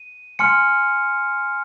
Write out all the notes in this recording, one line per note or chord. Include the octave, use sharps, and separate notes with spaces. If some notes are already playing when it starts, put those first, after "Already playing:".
Already playing: D#7
G#5 C6 F6 C#7